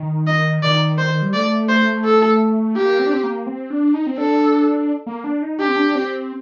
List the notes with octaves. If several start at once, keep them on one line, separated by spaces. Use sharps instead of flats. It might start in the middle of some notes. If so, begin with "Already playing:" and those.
Already playing: D#3
D#5
D#3 D5
C5
G3
A3 D5
C5
A4
A#3 G4
C4
D4
C4
A#3
C4
D4
D#4
C4
D4 A4
A#3
D4
D#4
D4 G4
C4
D4
C4